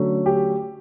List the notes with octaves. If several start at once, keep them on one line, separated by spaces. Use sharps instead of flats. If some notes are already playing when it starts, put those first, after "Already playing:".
Already playing: D3 F#3 A3 C#4
G4